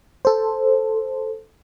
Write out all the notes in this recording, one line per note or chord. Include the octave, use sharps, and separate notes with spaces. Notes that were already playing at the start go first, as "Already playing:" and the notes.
A4 C5